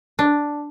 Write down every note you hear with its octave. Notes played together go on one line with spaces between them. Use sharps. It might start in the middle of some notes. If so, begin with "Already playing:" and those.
D4